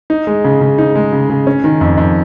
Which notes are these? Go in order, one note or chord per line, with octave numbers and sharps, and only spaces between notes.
D#4
G#3
C#3
C#3
D#4
G#3
C#3
C#3
C#4
D#3
F2
F2